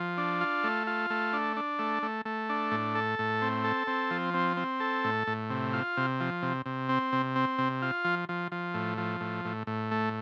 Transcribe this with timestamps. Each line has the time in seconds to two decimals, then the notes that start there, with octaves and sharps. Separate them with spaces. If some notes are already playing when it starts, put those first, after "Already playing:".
Already playing: F3
0.18 D4
0.41 F4
0.64 A3
0.87 F4
1.10 A3
1.33 D4
1.57 D4
1.79 A3
2.03 A3
2.25 A3
2.49 D4
2.71 A2
2.95 A4
3.19 A2
3.42 C4
3.64 A4
3.87 C4
4.10 F3
4.34 C4
4.57 C4
4.80 A4
5.04 A2
5.27 A2
5.50 C3
5.73 F4
5.97 C3
6.20 F3
6.42 C3
6.66 C3
6.89 C4
7.12 C3
7.36 C4
7.58 C3
7.82 F4
8.05 F3
8.29 F3
8.52 F3
8.74 A2
8.98 F3
9.21 A2
9.45 A2
9.67 A2
9.91 A3